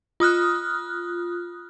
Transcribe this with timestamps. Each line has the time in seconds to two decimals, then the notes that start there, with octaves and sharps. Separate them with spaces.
0.20 F4 D#6 F6 F#6